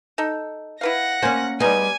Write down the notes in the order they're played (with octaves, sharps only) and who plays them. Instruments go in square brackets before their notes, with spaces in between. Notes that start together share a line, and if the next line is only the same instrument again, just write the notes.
[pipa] D#4 A4
[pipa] E4 B4 F5 [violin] F#5 A#6
[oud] A#3 C#4 [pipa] C5 G#5
[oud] G3 B3 [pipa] G#3 D#4 [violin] G#5